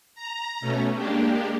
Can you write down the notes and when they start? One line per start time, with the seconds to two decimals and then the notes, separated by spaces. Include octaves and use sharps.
0.15 A#5
0.61 B2 A3 C#4
0.95 G#3 A#3 D4 G4